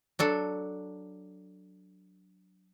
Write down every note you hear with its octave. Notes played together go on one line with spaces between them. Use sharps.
F#3 D4 A4